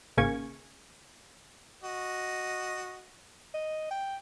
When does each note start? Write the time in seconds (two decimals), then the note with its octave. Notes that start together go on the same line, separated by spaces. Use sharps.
0.17 G#1 C#3 A#3 G#5 C#6 G#6
1.84 F#4 D#5
3.54 D#5
3.91 G5